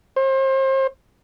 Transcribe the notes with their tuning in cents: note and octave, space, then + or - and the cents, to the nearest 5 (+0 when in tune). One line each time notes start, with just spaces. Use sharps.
C5 +35